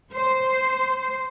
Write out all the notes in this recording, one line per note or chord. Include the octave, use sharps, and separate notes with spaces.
C5